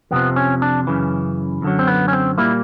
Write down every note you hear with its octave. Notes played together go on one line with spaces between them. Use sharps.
F2 C3 F3 B3
C#4
D4
F#2 C#3 E3
F#2 D3 F#3
C4
B3
C#4
C4
A#2 G3 A#3 E4